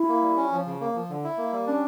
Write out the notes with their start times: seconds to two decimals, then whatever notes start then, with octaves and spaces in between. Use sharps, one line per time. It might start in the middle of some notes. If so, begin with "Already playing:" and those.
Already playing: E4
0.09 A#3
0.22 G3
0.37 C#4
0.52 F3
0.66 C#3
0.81 A#3
0.95 F3
1.09 D3
1.24 E4
1.38 A#3
1.52 G3
1.67 C#4 D4